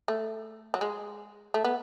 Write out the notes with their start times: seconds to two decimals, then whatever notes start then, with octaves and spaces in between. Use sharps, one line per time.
0.08 A3
0.74 F#3
0.81 G#3
1.54 A3
1.64 B3